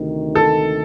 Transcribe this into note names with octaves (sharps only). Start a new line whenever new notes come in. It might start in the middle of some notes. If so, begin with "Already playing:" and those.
Already playing: D2 C3 D#3
A4